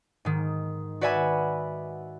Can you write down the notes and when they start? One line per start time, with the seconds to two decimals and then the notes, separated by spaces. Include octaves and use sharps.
0.25 G#2 D#3
1.01 F#4 B4 D5 E5 G#5 B5